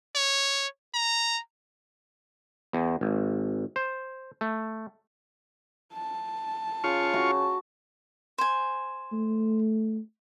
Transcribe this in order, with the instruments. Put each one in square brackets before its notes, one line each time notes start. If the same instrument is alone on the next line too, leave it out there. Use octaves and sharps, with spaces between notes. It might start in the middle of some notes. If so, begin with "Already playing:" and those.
[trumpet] C#5
A#5
[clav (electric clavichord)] E2
G#1
C5
A3
[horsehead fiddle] A5
[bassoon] C#3 [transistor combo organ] F4 C#6
[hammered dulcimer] F#4
[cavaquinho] C5 G#5
[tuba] A3